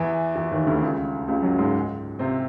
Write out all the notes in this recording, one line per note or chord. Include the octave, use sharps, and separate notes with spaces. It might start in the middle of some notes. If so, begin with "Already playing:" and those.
Already playing: E2 E3
E2 E3
D#2 D#3
D2 D3
C#2 C#3
C#2 C#3
F#2 F#3
G#2 G#3
C3 C4